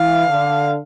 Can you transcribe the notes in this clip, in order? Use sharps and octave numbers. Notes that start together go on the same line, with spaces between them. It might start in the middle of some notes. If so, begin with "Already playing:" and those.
Already playing: E3 F5
D3